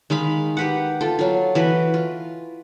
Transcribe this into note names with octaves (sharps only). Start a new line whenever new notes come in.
D#3 G#3 F5 B5
G4 B4 F#5
F4 A4
F#3 F4
E3 F#4 B4
F4